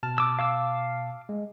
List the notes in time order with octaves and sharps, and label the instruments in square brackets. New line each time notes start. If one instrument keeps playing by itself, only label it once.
[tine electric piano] B2 A5 F6
[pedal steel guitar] D6 E6
F5 D6 E6
[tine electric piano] G#3